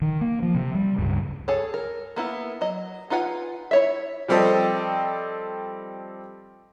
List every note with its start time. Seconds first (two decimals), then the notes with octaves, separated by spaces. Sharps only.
0.02 D#3
0.21 A#3
0.42 F3
0.55 C3
0.75 G3
0.99 C#2 G2
1.48 G#4 A4 C#5
1.74 A#4
2.16 A#3 B3 E4
2.61 F#3 D#5
3.10 D#4 F4 B4 F#5 G#5
3.71 E4 C#5 E5
4.28 F3 G3 C4 G4 A4 D#5